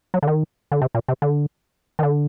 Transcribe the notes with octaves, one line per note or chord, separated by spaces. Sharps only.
F#3
D3
D#3
D3
C3
A#2
C3
D3
D#3
D3